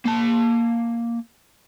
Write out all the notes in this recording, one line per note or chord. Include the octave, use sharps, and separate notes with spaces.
A#3 A5